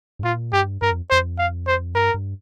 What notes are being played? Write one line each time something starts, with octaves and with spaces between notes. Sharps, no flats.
G2
A#2 F4
G2 G4
G2 A#4
F2
F2 C5
F5
C5
G2 A#4
G2